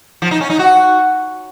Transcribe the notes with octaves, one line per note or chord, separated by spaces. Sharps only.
F3
D#4
C#4
D#4
F#4